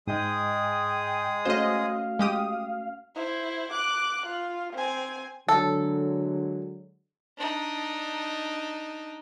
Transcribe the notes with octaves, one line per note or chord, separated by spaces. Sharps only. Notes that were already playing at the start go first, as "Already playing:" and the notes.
G#2 G#3 G#4 D#5 G5 D#6
A3 C#4 F#4 C5 D#5 F5
G#3 G4 D#6
E4 C5
D6 F#6
F4
C4 G#5
D3 F#3 G#3 A4
D4 D#4